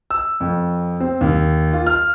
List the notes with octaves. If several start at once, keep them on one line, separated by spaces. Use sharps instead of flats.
E6
F2
C4
D#2
F4
F6